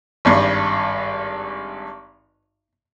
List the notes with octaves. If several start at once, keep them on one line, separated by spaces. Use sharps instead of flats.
G#1 G2